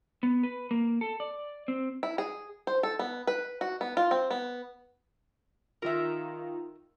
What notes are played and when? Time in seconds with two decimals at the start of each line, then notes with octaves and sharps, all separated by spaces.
0.23 B3
0.43 B4
0.71 A#3
1.01 A4
1.20 D5
1.68 C4
2.03 E4
2.18 G#4
2.67 C5
2.83 A4
2.99 B3
3.27 B4
3.61 F#4
3.81 B3
3.97 F4
4.11 C4
4.30 B3
5.82 D#3 F4 A#4 E5 A#5